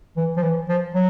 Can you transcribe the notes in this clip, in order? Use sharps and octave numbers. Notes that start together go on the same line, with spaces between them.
E3
F3
E3
F3
F#3